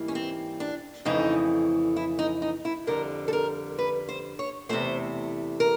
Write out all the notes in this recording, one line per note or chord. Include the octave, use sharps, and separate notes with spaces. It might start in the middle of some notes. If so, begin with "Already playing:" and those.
Already playing: G#2 E3 G3 A#3
C#4
C4
D4
F2 C#3 E3 A3 D#4
E4
D#4
D#4
E4
F2 D3 G3 A#4
A4
A#4
B4
C5
C#5
E2 C3 E3 A3 C5
A#4